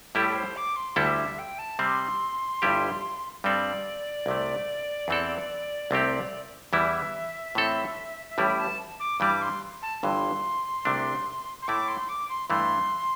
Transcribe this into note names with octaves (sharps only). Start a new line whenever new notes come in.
A2 G3 E4 G4 A4
A4
C5
D6
C6
D2 D3 G3 E4 A4 E5
E5
G5
A5
C3 G3 C4 C6
G1 G2 G3 E4 G4
G2 G3 C4 A4 D5
C2 C3 A3
E2 E3 C4 A4
C2 C3 A3 C4 G4
E2 E3 G3 E4 E5
A2 E3 C4 A4
E5
A1 A2 G3 E4 G5
A5
D6
G2 E3 G3 D6
C6
A5
G1 G2 E3 C6
C2 C3 A3 D4
C6
A2 A3 E4 D6
C6
D6
C6
G2 E3 A3 C6